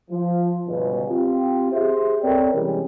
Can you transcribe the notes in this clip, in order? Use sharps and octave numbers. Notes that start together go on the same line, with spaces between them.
F3
G1 C#2 B2
C4 F4 G4
G4 G#4 C5 E5
C4 A4 A#4 C#5 D5 G5
C3 E3 G3 G#3 C4 C#4